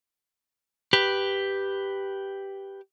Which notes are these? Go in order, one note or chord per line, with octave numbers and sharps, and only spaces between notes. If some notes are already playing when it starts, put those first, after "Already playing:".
G4 B4